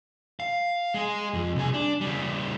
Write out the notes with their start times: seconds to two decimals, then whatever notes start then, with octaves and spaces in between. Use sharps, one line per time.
0.40 F5
0.94 G#3 G#4
1.34 F2
1.55 C2 G#4
1.74 D4
2.01 C#3 G3